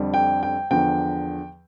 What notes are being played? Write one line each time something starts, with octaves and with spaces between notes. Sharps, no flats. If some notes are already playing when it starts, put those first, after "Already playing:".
Already playing: F2 D3 G3
G5
G5
E2 D3 F3 G5